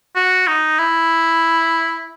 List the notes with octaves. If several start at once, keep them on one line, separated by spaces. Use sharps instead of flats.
F#4
D#4
E4